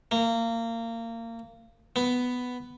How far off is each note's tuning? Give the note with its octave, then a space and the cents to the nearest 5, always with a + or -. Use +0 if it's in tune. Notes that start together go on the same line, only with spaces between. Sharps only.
A#3 -25
B3 +5